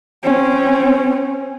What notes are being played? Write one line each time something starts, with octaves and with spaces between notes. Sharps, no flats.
C4 C#4